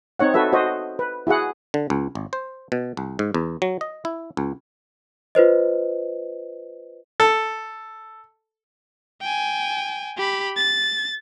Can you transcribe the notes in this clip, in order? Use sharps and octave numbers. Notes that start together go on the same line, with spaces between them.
C4 D#4 C#5 F#5
F#4 A4 B4 E5
F#4 C5 D#5
B4
E4 F#4 G#4 F#5
D3
C#2
G#1
C5
B2
C2
G#2
E2
F#3
D#5
E4
C#2
F4 B4 C5 D#5
A4
G5 G#5
G4 B5
A6